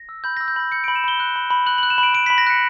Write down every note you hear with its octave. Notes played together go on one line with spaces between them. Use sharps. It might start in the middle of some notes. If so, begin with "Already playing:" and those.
Already playing: A#6
E6
B5 G6
E6 A#6
G6
B5 A#6
G6 C#7
B5 D7
E7
B5 G7
F#6
B5
B5
F#6 F#7
F#6 F#7
E7
B5
D7
B5 D7
B5 B6
A#6
F#6 C#7